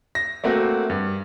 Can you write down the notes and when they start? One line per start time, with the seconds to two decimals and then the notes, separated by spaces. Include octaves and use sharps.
0.15 A#6
0.44 A3 A#3 C4 F#4
0.90 G2